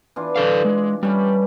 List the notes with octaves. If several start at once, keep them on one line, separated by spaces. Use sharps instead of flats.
E3 D4 F4
D3 A4 F5
G#3
G3 A3 C#4 B4